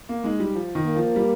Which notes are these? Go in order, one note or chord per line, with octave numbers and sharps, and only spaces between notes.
A#3
G#3 D#4
G3
F3
D#3
A#3
F3
G3